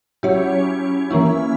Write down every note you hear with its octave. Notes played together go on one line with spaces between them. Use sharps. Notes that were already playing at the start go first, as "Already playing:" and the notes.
F#3 C#4 E4 G4 C#5
E3 A#3 C#4 E4